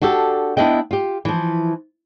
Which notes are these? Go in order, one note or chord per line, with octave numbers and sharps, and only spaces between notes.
D4 F#4 G4 A4
B3 D4 E4 D#5 G5
F4 G4
E3 F3